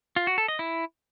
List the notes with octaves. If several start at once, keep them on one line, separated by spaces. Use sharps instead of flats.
F4
F#4
A4
D#5
E4